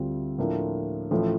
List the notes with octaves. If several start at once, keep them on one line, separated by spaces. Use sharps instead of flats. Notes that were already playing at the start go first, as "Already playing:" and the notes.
Already playing: D2 D3 G3 C4 F4
A2 F3 A#3 D4 F4
A1 A2 F3 A3